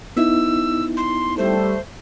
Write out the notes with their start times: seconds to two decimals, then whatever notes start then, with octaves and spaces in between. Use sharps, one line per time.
0.17 B3 D#4 E4 E6
0.97 C6
1.38 G3 A3 C5